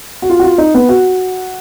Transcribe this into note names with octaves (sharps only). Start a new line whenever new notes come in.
F#4
F4
F#4
F4
D#4
B3
F#4